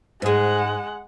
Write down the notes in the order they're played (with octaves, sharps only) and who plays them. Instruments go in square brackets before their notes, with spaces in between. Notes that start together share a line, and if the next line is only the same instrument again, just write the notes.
[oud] G#2 G#4 [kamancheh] G#3 F#5